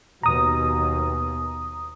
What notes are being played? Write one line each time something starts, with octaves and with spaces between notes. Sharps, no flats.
D#2 B2 A#5 D#6